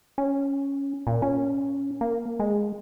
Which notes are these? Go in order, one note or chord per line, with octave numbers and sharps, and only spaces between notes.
C#4
A#2
C#4
A#3
G#3